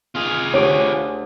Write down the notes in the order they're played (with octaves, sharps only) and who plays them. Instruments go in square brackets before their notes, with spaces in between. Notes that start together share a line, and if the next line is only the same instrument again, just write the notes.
[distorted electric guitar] F4 G#4
[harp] D2 G4 D6 [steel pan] C#5